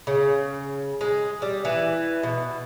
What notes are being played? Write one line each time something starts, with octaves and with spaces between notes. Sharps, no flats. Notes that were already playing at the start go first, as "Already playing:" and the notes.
C#3
G#3
G3
E3
B2